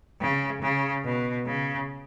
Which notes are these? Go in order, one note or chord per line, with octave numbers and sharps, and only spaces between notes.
C#3
C#3
B2
C#3